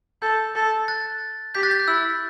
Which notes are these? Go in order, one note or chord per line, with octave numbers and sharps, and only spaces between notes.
A4 G6
A4
F#6 A6
G4 G6 B6
F#6 A6
G6
F#6
E4 E6